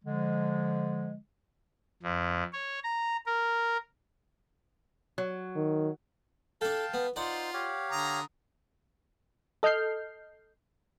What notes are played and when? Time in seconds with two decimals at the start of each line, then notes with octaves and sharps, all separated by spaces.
0.04 D3 F3 G#3
2.03 F2
2.53 C#5
2.84 A#5
3.26 A#4
5.18 F#3
5.56 D#3
6.61 D4 A4 F5 G5 A5
6.94 B3
7.16 D#4 F4 C5 D5 F#5
7.54 G4 C#5 F5
7.92 D3 A#5 D#6
9.63 A4 D#5 F6 G6 C7